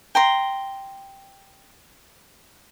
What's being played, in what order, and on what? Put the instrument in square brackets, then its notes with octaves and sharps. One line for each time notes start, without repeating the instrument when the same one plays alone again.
[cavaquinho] G5 A#5 C6